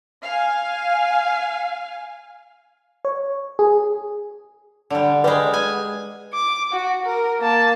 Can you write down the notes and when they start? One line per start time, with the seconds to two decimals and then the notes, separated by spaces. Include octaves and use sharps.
0.23 F5 G#5
3.05 C#5
3.59 G#4
4.90 D3 G3
5.24 G3 G#3 B4 F#5
5.54 G#5
6.33 D6
6.73 F#4
7.06 A#4
7.40 A#3 A5